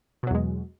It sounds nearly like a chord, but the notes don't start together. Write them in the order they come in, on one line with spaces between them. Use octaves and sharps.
B2 F#3 E2 G#3